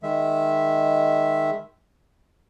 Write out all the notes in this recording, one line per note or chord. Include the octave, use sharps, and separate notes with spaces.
D#3 G#3 E5